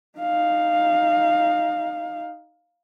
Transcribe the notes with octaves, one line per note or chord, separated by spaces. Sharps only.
D#4 F5